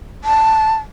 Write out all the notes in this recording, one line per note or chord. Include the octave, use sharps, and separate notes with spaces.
A5